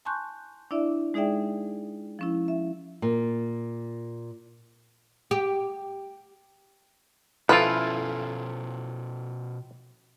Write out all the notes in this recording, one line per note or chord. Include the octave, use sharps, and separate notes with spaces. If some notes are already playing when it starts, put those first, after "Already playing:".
G#5 A5 C6 C#6 F#6 G6
D4 E4 D5 E5
G#3 D#4 G#4 D5 E5 G5
F3 C#4 E4
E5
A#2
G4
B2 F3 C#4 E4 F4 A4 B4 F5